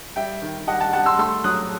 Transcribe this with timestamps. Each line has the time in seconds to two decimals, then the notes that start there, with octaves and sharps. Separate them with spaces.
0.16 G3 E5 G5
0.42 D#3
0.67 G3 D#5 F#5
0.80 F#5 A5
0.93 G3 F#5 A5
1.06 C6 E6
1.18 A3 C6 E6
1.44 F#3 D#6 F#6